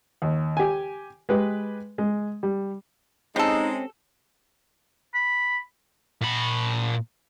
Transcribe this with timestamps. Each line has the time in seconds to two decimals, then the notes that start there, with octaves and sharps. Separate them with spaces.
0.22 D#2
0.57 G4 G#5
1.29 G#3 G4 B4
1.98 G#3
2.43 G3
3.36 G#3 C4 C#4 D#4 G4 A4
5.14 B5
6.21 A#2 B5